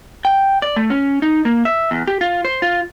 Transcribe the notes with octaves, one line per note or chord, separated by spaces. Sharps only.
G5
D5
A3
C#4
D#4
A#3
E5
E2
G4
F4
C5
F4